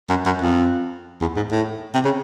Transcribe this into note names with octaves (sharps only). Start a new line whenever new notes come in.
F#2
F#2
F2
E2
G#2
A2
C3
C#3